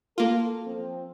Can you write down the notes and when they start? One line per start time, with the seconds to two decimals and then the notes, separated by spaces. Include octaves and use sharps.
0.18 A#3 F4 A4
0.66 F3 C4